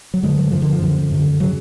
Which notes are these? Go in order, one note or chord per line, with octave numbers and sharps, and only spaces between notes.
F#3
F#2 D3 G#3
F#3
F#2 D3 F3
D3
F3
F#2 D3
F#2 D3
C#3 F#3